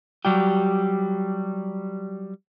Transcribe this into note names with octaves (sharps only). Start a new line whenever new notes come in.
F#3 G3 G4